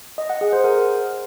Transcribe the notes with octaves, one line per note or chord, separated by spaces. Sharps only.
D#5
F#5
G#4
C5
A#4